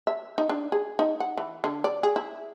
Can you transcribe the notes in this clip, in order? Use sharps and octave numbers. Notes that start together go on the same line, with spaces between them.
E5
D#4
D4
G#4
D#4
F#5
E3
D3
D5
G#4
E4